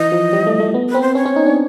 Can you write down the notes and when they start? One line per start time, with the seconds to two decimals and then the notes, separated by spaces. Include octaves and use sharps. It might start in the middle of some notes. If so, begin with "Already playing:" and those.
Already playing: E3 D#5
0.12 F3
0.33 G3
0.47 A3
0.60 A3
0.74 B3
0.89 B4
0.94 C4
1.02 C5
1.15 C#4 C#5
1.25 C#4
1.36 D#4
1.46 D4